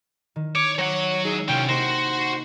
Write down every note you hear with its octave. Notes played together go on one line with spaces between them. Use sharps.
D#3
C#5 D6
F#3 C#5 F#5
D#4 G#4 E5
C3 A#3 C#4 F4 F#4 G5
A#3 D#4 F#4 G4 C5